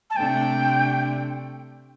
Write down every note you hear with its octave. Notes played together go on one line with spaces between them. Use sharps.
A5
C3 A3 D4 G5